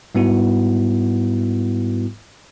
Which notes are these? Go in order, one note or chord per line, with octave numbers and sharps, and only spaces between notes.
G#2 G3 B3 E4 F#4